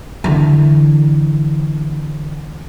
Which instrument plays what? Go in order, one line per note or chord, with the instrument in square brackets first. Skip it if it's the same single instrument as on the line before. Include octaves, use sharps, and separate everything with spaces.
[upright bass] D3 E3